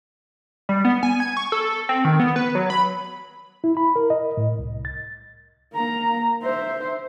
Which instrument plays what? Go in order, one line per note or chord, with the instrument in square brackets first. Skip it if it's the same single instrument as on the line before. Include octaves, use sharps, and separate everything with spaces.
[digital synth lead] G3
B3
G#5
G#6
C#6
A4
C4
D#3
B3
B4
F#3
B5
[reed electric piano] E4
B5
A#4
D#5
A2
C2
A6
[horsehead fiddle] A#3 A#5
C5 E5